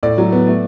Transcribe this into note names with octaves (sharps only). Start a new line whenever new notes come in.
A2 D5
F#3
B3
A3